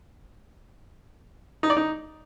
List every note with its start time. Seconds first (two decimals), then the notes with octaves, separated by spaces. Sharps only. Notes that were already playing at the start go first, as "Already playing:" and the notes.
1.63 D#4
1.70 D5
1.77 D#4